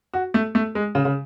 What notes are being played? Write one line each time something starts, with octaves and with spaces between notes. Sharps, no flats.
F#4
A3
A3
G#3
C#3
C#3